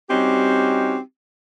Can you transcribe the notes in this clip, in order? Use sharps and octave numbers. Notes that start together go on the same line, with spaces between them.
G3 C4 C#4 D#4 F#4 G4